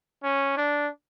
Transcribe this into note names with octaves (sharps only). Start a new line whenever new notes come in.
C#4
D4